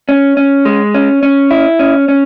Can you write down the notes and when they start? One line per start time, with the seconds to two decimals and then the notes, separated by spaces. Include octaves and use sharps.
0.09 C#4
0.37 C#4
0.65 G#3
0.94 C#4
1.23 C#4
1.51 E4
1.79 C#4
2.09 C#4